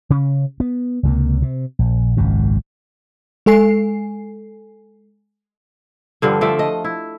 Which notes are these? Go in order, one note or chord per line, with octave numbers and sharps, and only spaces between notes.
C#3 C#4
B3
C#2 C3 A#3
C3
A#1
G#1 C#2 F#2 A#2
G#3 A4 G#5 C7
G2 D3 F3 G3
F3 A3 D5 E5
D#5
E4